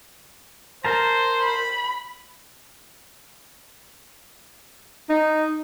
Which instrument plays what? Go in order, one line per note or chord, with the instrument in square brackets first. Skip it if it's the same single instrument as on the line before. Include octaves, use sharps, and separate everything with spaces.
[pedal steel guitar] A#4 A5 A#5 [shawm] C5
[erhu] B5
[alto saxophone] D#4